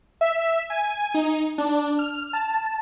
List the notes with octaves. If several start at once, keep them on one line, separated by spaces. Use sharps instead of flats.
E5
G#5
D#4
D4
F6
A5